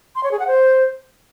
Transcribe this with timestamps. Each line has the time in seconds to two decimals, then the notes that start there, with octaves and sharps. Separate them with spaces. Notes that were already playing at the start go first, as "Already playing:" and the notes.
0.15 C6
0.23 C#5
0.31 G#4
0.39 F#5
0.47 C5